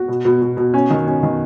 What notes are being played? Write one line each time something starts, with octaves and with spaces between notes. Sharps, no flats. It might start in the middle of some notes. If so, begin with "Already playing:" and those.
Already playing: F#4
B2
B2
B2
B2
C#4
D#3
C#4
D#3